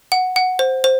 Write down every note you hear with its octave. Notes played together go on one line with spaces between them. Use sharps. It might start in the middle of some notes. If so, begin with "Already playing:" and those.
F#5
F#5
C5
C5